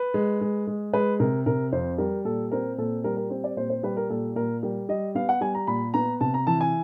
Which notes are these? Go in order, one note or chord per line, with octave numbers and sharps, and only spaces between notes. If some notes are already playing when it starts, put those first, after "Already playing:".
Already playing: B4
G#3
G#3
G#3
G#3 B4
C3 A#4
C3 A#4
F2 C5
G3 A#4
A#2 A4
C4 A#4
A#2 A4
G3 A#4
A#4
C4
D5
A#2 C5
C5
G3 B4
A#4
A#2 A4
A#2 A#4
G3 A#4
G3 D#5
B3 F5
F#5
G3 G#5
A#5
A#2 B5
B3 A#5
C3 A5
A#5
E3 A5
G#5